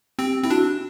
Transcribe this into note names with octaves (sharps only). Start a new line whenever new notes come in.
C4 G4
C4 E4
D4 F#4